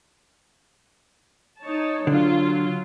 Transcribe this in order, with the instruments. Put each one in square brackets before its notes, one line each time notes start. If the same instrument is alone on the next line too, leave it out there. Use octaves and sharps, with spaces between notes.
[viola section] D#4 C#5 A5
[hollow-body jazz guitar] D3 [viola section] F#3 F4